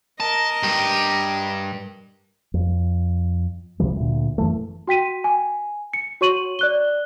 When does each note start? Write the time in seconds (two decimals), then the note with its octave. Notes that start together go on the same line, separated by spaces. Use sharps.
0.20 A#4 D#5 A5
0.63 G2 G4
2.54 F2
3.80 C#2 C3 F3 G3
3.96 D2 A#2
4.38 F#2 E3 A3
4.88 F#4 G5 B6 D#7
5.24 G#5
5.93 C#7
6.21 F#4 C#5 C#6 D#7 F#7
6.59 D5 F#6 G7